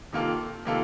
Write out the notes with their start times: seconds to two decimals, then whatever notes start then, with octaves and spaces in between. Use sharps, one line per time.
0.13 C3 D#3 A#3 F4 A4
0.65 C3 D#3 A#3 F4 A4